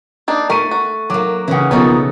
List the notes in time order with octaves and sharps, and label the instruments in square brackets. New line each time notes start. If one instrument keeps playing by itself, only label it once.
[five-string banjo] A#3 D4 D#4
[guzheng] A3 [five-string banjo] A#4 [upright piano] C#6 D#7
[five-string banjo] F#4
[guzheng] F#3 A#3 [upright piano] D6
[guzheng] C#3 E3 [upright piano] C#4 F#5
[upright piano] B1 F3 [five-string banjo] B3 C#4 D#4 [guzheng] A4 A#4 G#5